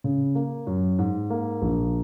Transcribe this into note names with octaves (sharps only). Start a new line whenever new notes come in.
C#3
A#3
F#2
G#2
A#3
A#1